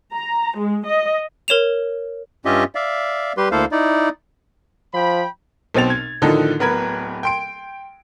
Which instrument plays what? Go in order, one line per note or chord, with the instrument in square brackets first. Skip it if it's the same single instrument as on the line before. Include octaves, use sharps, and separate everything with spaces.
[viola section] A#5
G#3
D#5
[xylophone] A#4 C#5 E7 F7
[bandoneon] G2 C#4 F4 G4 D#5 E5
D5 E5 F5
G3 G4 B4 C6
D2 A#3 E4 A4 C5 F5
D#4 E4 D5
[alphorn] F3 [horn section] G5 B5
[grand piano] B1 B2 C4 A6 F7
G#6
A2 D3 D#3 F3 D#4 A4
D1 B3 A#4 B5 G#6
G5 C6 D7